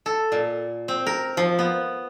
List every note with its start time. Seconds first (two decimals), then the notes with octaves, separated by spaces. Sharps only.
0.06 A4
0.32 A#2
0.88 C4
1.06 A#4
1.37 F3
1.59 B3